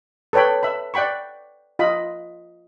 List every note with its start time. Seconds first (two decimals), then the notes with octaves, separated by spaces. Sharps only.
0.33 A4 B4 C#5 G5 B5
0.63 E5 B5
0.94 D5 F#5 G5 B5 C#6
1.79 F4 D#5 B5